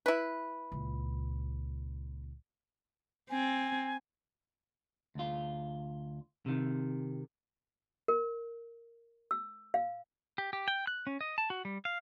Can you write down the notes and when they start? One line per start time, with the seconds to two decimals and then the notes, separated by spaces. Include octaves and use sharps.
0.06 E4 B4
0.72 C#2 A#2
3.30 C4 G#5
5.15 D2 F4
6.46 C3 D#3
8.08 A#4
9.31 E6
9.74 F5
10.38 G4
10.53 G4
10.68 G5
10.87 F#6
11.07 C#4
11.21 D#5
11.38 A5
11.50 F#4
11.65 G3
11.85 F5